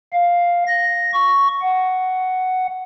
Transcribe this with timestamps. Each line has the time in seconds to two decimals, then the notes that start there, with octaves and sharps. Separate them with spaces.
0.13 F5
0.67 A#6
1.13 C#6
1.62 F#5